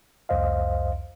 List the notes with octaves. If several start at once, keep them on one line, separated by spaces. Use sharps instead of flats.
C2 F2 C5 D#5 F5